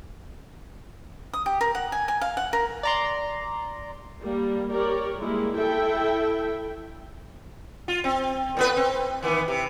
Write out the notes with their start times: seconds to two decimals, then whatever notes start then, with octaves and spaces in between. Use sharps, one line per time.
1.34 D#6
1.46 G4
1.61 A#4
1.75 F#5
1.92 G#5
2.08 G#5
2.21 F5
2.37 F#5
2.53 A#4
2.83 D5 A#5 C6
4.22 G3 A#3
4.74 G4 A#4 C#5 D5
5.19 G3 G#3 A#3 E4
5.57 E4 A4 E5 G5
7.88 F4
8.04 C4
8.57 A2 B3 B4
8.76 C4
9.22 D#3 E3 B3
9.48 C3